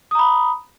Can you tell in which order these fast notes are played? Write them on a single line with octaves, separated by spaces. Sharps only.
D#6 A#5 B5